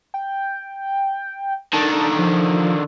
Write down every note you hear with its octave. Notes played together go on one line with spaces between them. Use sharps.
G5
D3 D#3 A5
F3